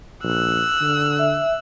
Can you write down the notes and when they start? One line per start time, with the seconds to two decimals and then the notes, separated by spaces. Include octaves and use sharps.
0.24 A#1 E6 F#6
0.81 D3
1.19 E5